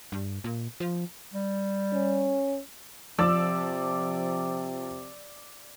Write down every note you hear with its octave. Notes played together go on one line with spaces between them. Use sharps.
G2
A#2
F3
G3
C#4
C3 F3 D5 E6